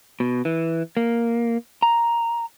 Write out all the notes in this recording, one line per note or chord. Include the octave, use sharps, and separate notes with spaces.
B2
E3
A#3
A#5